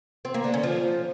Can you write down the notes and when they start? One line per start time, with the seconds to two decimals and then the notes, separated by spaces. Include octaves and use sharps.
0.25 C4
0.34 A#3
0.44 D3
0.54 C#4
0.63 F3